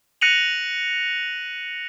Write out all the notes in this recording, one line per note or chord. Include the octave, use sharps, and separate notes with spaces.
F#6 A#6 C#7 D#7 F7 F#7